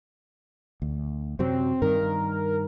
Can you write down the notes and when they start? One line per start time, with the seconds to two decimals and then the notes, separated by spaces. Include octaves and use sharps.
0.82 D2
1.39 F#2 C3 F#3 C4
1.82 G2 D#3 A#4